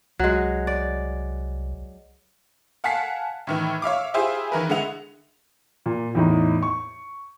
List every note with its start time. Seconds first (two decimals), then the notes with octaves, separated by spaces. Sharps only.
0.19 C2 F#3 G#3
0.67 D5
2.84 F5 F#5 G#5 A5 B6 C7
3.47 A2 D#3 E3
3.82 C#5 E5 F5 D6
4.14 E4 F4 G4 G#4 C5 E5
4.52 D#3 E3 A#4 B4
4.69 D3 G#3 E4 F#5 F7
5.86 A#2
6.15 E2 A2 D#4
6.63 C#6